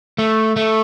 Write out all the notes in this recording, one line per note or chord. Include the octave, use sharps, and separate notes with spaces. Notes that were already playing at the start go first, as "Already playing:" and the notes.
A3
A3